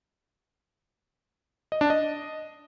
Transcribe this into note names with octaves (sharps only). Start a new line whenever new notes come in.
D#5
D4
D#5